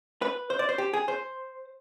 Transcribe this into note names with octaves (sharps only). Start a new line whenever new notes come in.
B4
C5
D5
C5
G4
G#4
C5